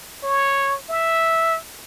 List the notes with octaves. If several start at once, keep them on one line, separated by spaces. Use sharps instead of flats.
C#5
E5